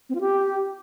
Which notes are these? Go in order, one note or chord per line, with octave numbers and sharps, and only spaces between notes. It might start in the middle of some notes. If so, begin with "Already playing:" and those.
C4
F4
G4